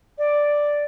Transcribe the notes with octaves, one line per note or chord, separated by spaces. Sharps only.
D5